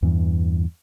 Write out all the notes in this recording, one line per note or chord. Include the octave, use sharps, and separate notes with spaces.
E2 G2 E3